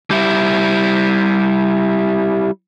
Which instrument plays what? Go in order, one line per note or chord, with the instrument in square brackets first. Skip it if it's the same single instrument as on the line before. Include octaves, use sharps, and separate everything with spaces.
[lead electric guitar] G3 E4